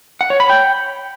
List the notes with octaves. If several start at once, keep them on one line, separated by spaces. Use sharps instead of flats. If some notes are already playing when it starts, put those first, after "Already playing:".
F#5
C#5
B5
G5